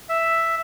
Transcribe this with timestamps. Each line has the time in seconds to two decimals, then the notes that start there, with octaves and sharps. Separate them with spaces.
0.09 E5